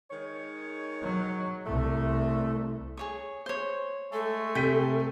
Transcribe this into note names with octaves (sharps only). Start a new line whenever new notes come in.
D#3 G#3 C#5
F#3
C2 A3
G#4 C#5 C#6
C5 C#5
G#3 A3 A4
C3 G5 B6 D#7